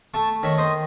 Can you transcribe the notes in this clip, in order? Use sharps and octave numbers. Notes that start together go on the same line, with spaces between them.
A3 A5 C#6
D#3 C#5 E5
C5 D#5